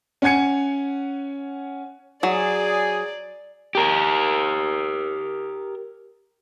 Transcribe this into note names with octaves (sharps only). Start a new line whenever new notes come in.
C#4 F#5 G#5 G#6 C#7
F#3 G#4 D5
G4 A#4